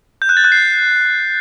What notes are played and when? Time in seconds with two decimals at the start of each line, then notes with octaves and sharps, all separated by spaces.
0.22 G6
0.29 F#6
0.37 A6
0.44 F#6
0.52 C7